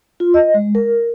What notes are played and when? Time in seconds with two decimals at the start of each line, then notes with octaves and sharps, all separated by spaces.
0.20 F4
0.34 D#5
0.54 G#3
0.75 A#4